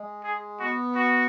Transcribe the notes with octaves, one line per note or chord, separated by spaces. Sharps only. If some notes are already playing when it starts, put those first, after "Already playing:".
Already playing: G#3
G#4
B3 F#4
F#4